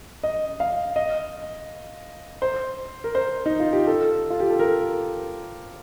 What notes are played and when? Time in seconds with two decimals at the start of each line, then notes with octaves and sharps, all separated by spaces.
0.23 D#5
0.60 F5
0.96 D#5
2.42 C5
3.04 A#4
3.15 C5
3.46 D#4
3.60 F4
3.73 G4
3.87 A4
4.30 F4
4.40 G4
4.50 A4
4.59 A#4